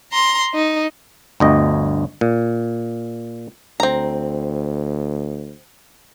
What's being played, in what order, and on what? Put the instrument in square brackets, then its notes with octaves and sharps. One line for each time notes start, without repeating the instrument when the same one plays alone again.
[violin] A#5 C6
D#4
[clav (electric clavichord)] G1 D2 D#5
A#2
[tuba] D2 [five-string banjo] C4 A#5